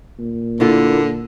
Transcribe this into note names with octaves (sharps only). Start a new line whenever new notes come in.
A#2
D3 A#3 E4 F4